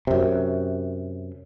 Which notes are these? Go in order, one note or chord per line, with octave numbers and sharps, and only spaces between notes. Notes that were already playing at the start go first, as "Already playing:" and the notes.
F#2 C3